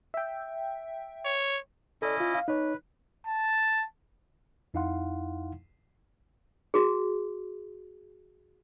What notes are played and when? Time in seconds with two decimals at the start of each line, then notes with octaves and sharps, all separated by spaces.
0.14 E5 G5
1.25 C#5
2.02 C#4 E4 A4 D5 D#5
2.20 F4
2.35 F5
2.48 D#4 B4 C#5
3.27 A5
4.74 F2 D#4 E4 F5 F#5 C6
6.74 F#4 G#4